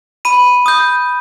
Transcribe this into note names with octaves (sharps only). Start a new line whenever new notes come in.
B5 D#7
D#6 G6